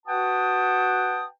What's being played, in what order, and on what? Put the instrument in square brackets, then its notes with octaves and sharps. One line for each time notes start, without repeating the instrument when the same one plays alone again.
[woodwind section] F#4 B4 F#5 G5 A5 D#6